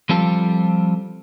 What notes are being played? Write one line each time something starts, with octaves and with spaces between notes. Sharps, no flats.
F3 G3 C4 F4 A4